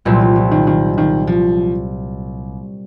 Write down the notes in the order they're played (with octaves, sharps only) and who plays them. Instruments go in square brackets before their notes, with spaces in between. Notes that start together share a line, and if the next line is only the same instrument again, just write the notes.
[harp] C2 A#2 F#3 C4 [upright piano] F3
[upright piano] F3
F3
D#3
D#3
D#3
F3